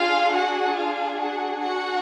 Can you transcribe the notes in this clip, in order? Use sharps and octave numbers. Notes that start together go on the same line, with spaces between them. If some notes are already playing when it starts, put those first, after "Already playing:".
Already playing: D4 F4 G#4 F5
F#4 F#5
F4 F5
F#4 F#5
F#4 F#5